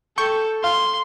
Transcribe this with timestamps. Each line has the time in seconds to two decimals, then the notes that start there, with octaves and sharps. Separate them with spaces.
0.18 A4 G5 C#6 G6
0.64 F5 C6